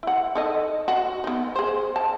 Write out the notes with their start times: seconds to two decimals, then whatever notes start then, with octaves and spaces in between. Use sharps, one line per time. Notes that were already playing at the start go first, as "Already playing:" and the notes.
0.03 E4 F#5
0.35 D#4 A4 D#5
0.88 F#4
1.24 B3 D#4
1.55 G#4 C5
1.96 A5